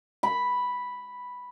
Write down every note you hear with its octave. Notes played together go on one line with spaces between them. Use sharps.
B5